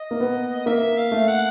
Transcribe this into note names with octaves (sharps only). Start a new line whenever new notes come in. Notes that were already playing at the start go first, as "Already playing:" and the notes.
Already playing: D#5
A#3
B3
A#3 E5
F5
A3
F#5